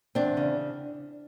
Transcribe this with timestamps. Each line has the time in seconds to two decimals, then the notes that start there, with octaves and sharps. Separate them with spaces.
0.15 E2 C4 D4
0.37 C#3